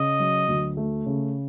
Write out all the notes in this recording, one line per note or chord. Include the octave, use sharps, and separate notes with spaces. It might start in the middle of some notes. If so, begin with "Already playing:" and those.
Already playing: C#3 D#5
F#3
D2
A3
C#3